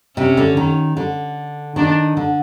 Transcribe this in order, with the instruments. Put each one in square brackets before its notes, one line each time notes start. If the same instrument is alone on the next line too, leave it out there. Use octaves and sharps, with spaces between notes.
[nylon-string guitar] C3 [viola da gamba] C#4
[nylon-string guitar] D3
D#3
D3
[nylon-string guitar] D#3 [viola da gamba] D4
[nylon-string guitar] D3